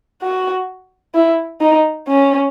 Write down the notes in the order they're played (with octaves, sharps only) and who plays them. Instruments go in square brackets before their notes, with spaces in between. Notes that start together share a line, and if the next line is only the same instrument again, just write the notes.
[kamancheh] F#4
E4
D#4
C#4